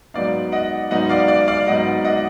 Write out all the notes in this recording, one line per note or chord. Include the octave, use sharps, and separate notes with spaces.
G#2 F#3 B3 D#4 D5 F5
D#5 F#5
G#2 F#3 B3 D#4 D#5 F#5
D5 F5
D5 F5
D5 F5
G#2 F#3 B3 D#4 D#5 F#5
D#5 F#5